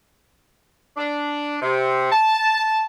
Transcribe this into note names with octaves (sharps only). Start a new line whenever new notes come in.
D4
C3
A5